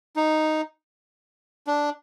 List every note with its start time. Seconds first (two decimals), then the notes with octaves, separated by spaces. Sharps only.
0.16 D#4
1.67 D4